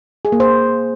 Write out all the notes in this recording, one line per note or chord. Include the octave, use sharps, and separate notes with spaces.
G#4
A#3
C5